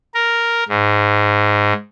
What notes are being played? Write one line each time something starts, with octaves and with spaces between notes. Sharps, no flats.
A#4
G#2